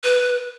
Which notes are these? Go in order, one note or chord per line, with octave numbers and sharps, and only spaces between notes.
B4